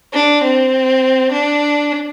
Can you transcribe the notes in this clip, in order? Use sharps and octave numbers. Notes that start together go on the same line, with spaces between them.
D4
C4
D4